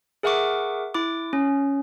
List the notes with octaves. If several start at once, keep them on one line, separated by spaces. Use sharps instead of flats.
G#4 A#4 E5 F#5 C#6 D6
E4 D6
C#4